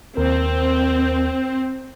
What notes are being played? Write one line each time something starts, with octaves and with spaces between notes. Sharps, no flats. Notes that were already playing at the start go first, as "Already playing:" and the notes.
D#2 C4 A#4